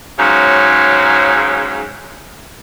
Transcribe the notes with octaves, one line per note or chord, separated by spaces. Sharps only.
G#2 C#3 F#3